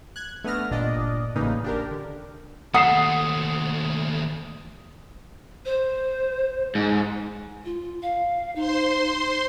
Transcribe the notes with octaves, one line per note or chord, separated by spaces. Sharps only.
F#6 G#6
A3 B3 D4 D#6 F6 A#6
G1 A#2 D4 D5 D#5
A1 C#3 A#3 D#4 B4
D4 G4 A#4
D3
D#2 A3 F#5 D#6 C7 E7
C5
G#2
F4
F5
D#4 C5 C6